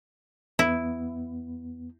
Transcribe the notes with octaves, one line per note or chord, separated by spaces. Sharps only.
E2 B3 E4